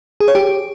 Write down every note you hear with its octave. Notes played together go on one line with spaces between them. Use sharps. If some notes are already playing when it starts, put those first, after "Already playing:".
G#4
C#5
G4